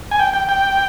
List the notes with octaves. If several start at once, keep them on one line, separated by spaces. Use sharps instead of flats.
G#5
G5
G5
G5